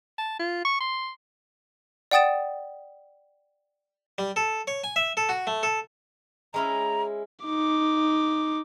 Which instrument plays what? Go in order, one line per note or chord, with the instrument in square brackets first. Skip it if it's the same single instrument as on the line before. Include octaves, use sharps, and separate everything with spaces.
[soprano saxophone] A5
F4
C#6
C6
[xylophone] D5 F#5 G5 D#6 A6 E7
[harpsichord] G3
A4
C#5
G#5
E5
A4
F#4
A3
A4
[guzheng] G#3 C#4 E4 [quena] A#5
[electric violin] D#4 D6